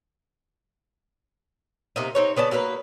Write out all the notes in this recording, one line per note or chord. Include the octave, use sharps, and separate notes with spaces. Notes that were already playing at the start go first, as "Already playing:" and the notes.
C3 A#3 D#4
C4 D#4 C#5
C#3 B3 D5 A5
F#3 A#3 A#4 B4